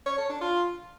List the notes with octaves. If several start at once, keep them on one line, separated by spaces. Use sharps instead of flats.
C#5
A4
D4
F4